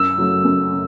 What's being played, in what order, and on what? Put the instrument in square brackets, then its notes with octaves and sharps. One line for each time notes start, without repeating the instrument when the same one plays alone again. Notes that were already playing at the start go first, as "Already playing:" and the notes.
Already playing: [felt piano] F#2 [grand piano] E6
[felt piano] C#3 F#3 A3
F#2
C#3